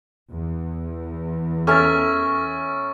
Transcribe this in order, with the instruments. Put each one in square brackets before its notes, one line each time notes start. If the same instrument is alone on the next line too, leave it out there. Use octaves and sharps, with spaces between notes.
[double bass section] E2
[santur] C#4 A#4 E5 [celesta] A4 F6 [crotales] C#6 A6